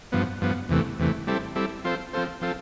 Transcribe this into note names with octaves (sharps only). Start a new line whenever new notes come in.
G2 F3 B3
G2 F3 B3
E2 C3 E3 A3
E2 C3 E3 A3
G3 C4 E4 A4
G3 C4 E4 A4
F3 C4 F4 A4 C5
F3 C4 F4 A4 C5
F3 C4 F4 A4